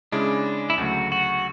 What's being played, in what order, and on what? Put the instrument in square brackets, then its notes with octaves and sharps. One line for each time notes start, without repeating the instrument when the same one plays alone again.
[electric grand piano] C#3 G#3 C#4 E4 G#4 [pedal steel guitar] D4
[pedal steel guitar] E4
[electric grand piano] D2 C#3 F#3 A3 [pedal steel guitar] F#4
[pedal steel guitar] F#4